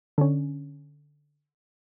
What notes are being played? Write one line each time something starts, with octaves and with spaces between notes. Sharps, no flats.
D3 C#4